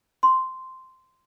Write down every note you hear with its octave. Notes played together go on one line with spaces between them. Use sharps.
C6